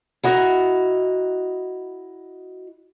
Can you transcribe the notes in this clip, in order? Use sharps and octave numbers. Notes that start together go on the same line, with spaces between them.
E4 F#4 D#5 A#5